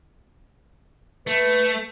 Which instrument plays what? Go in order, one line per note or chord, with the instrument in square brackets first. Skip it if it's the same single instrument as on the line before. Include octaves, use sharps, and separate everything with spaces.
[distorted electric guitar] A3 [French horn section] B4